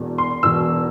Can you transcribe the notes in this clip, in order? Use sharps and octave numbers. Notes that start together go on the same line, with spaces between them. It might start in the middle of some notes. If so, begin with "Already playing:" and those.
Already playing: E1 E2 B2
C6
E1 E2 B2 E6